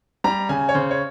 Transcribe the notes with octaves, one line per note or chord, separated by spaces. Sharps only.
G3 A#5
C#3 G#5
C#5
C#3 C5
C#5